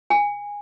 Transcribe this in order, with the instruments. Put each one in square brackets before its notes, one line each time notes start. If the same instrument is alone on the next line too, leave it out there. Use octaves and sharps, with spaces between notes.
[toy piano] G#5